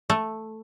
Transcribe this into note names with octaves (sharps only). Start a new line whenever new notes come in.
A3